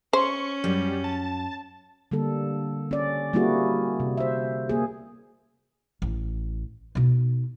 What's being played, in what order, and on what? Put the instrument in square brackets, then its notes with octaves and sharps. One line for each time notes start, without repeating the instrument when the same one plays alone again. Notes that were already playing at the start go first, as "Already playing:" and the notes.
[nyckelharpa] C#4 [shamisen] C5 [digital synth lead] C#6
[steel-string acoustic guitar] F#2 [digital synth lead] G3
[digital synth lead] A5
[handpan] D3 G3 A#3 A4
C#4 D5
G3 A#3 C4 E4 F#4 G#4
C3
C5 E5
A#3 G#4
[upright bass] A1
B2 D#4